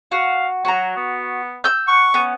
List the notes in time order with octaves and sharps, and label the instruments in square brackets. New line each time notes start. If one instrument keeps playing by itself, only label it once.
[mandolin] F#4 [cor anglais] F5
[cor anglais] F#3 [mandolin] F#4 A#5
[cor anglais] B3
[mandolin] E6 G6
[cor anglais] F#5 [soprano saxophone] C#6
[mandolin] B3 [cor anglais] C#4